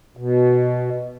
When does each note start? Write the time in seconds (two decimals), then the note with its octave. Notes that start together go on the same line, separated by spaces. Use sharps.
0.17 B2